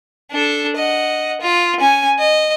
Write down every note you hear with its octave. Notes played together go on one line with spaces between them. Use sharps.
D4 A4
D#5 F#5
F4
C#4 G#5
D#5